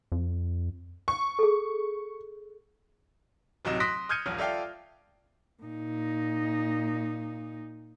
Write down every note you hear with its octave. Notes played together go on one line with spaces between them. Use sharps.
F2
C#6
G#4 A4
D1 C3 F#3 D#4 E7
C6 D#6 F#6 A#6 B6 D7
D#6 F6 G6 G#6 C#7 D#7
D#1 A#1 F3 F6
F4 A4 D5 E5 F5 G5
A#2 D#4